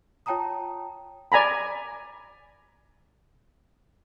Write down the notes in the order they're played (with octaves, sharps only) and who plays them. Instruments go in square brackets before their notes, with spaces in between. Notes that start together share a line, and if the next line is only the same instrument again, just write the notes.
[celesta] F4 C#5 G5 A5 A#5 D#6
[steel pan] D5 G#5 A#5 B5